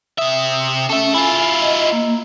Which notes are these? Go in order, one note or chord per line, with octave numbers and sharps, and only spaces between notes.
C3 E5 D#6
C#4 A4 E5
E4 F4 G#5
D#5
A#3